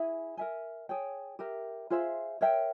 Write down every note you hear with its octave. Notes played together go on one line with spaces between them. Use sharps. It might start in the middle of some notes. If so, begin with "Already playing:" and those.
Already playing: E4 G#4 E5 G#5
A#4 E5 G#5
G#4 C#5 G5
G4 A#4 E5
F4 G#4 C5 E5
A#4 C#5 E5 G5